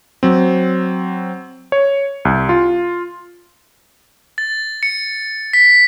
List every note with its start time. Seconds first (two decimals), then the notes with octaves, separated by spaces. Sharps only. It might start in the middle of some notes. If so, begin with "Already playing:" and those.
0.23 F#3 C4
1.72 C#5
2.25 C2
2.49 F4
4.38 A6
4.83 C#7
5.53 B6